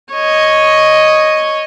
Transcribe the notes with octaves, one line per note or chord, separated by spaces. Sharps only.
C#5 D#5